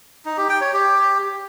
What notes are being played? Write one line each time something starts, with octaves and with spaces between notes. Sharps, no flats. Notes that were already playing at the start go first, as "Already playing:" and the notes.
D#4
G4
G5
C#5
G4